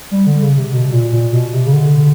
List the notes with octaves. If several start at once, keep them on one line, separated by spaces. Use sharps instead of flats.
G3
D3
C#3
C3
B2
A#2
A#2
B2
C3
C#3
D3